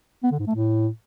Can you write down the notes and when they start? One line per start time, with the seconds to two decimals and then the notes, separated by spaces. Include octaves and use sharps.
0.23 B3
0.31 D3
0.39 G#2
0.47 A3
0.55 A2